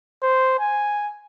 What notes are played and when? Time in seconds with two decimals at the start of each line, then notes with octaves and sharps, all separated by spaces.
0.23 C5
0.60 G#5